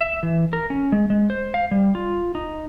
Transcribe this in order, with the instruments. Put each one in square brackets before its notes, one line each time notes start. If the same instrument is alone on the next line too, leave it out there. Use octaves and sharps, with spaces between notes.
[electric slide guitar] E5
E3
A#4
C#4
G#3
G#3
C5
F5
G3
F4
D#4